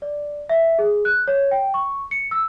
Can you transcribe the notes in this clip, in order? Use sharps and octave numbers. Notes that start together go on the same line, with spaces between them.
D5
E5
G#4
F#6
C#5
G5
C#6
C#7
E6